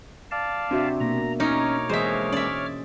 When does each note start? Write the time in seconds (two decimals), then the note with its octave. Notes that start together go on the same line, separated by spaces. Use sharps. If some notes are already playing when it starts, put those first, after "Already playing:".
0.31 D5 F5 A5
0.71 C3 D4 F#4 E5
1.00 B2 A#3 A#5
1.40 C#4 D#4 C#5 D6 F6
1.89 E3 G#3 A#3 G#4 C5 D#5 E5
2.32 C#4 D5 E5